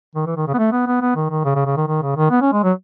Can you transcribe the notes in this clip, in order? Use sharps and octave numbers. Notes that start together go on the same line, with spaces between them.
D#3
E3
D#3
C#3
B3
A3
B3
B3
B3
D#3
D#3
C#3
C#3
C#3
D#3
D#3
C#3
D#3
B3
C#4
G#3
F#3